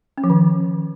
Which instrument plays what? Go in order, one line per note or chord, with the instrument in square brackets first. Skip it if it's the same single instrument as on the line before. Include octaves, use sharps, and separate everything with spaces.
[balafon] C#4
F3
D#3